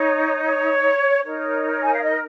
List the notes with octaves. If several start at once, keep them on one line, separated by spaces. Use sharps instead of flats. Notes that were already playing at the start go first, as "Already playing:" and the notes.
Already playing: D#4 C#5
C#5
D#4 A#4 C#5
G#5
F5
D#5